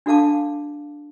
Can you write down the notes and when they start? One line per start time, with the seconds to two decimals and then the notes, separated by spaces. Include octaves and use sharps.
0.06 D4 F#4 A4 F5 A5 D6